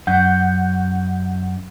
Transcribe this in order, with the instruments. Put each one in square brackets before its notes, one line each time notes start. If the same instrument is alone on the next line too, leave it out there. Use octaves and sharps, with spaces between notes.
[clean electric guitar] F#2 [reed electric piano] F#5 G6